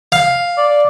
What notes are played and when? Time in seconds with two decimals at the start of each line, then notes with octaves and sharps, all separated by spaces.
0.12 F5
0.58 D5